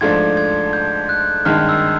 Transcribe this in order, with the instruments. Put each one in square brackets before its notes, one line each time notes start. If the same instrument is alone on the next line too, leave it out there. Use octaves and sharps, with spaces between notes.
[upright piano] G#2 F3 A3 D4 [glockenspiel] G#6
[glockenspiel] G#6
G6
F#6
[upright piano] G#1 G2 D#3 G#3 [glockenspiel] F6
[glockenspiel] E6